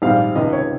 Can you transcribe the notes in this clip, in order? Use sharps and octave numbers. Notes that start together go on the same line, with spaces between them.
A#1 G#2 D#3 G3 C4 F5
C#2 C3 D#3 D#5
C#5